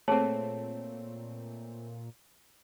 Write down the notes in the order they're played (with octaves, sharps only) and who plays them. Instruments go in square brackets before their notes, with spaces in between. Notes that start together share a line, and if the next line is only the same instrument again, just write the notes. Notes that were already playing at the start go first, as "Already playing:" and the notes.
[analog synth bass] A#2 [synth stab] A3 C4 [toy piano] G#4 A5 [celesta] C#5